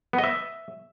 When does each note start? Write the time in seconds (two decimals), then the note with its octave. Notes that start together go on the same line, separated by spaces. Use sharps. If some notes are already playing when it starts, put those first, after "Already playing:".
0.13 B3
0.18 D#5
0.24 E5